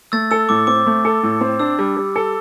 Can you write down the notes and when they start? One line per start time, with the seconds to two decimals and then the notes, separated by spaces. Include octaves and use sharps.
0.12 A3 E6 A6
0.31 A4 E6
0.49 A2 D6
0.67 C4 D6
0.86 A3
1.05 A4
1.23 A2
1.41 C4
1.60 D4 E6
1.79 G3
1.97 G3
2.16 A4